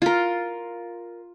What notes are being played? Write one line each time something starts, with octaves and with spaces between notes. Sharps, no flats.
F4 A#4